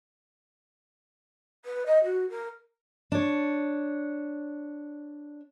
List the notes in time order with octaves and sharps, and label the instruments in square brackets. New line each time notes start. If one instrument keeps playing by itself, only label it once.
[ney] B4
D#5
F#4
A#4
[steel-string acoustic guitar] D4 C#5